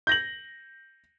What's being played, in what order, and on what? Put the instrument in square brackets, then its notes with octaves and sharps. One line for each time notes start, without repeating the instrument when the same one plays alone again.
[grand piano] G6 A#6 F#7